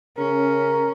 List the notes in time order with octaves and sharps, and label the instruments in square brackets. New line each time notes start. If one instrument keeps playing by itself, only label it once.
[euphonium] C#3 [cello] C#4 [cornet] A#4